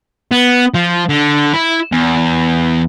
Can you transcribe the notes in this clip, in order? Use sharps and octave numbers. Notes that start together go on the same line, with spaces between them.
B3
F3
D3
E4
E2